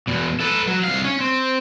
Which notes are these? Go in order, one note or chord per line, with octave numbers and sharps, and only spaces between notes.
E2 B2
A4 B4
F#3
C2 F5
C#4
C4